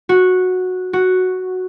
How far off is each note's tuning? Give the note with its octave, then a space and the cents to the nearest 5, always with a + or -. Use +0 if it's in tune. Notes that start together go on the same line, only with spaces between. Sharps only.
F#4 -10
F#4 +0